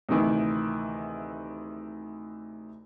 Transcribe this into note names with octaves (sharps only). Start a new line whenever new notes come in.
D2 C3 D#3 E3